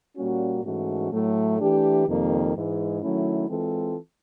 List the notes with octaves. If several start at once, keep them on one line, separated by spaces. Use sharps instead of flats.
A#2 G3 A#3 C#4 F#4
G#2 E3 A3 C#4 F#4
A2 F#3 A3
E3 A3 D4 G4
F2 C3 D#3 G3 A#3
G#2 E3 G#3
D#3 F#3 A3 C#4 E4
E3 G#3 C4 F4 A4